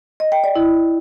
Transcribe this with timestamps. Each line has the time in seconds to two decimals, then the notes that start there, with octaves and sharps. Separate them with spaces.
0.20 D#5
0.32 G5
0.44 D5
0.56 E4